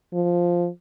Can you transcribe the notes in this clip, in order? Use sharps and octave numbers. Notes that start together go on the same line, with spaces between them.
F3